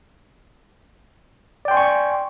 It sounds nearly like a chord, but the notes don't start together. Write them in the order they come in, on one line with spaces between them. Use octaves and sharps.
D5 G5 C6 G#5 C#6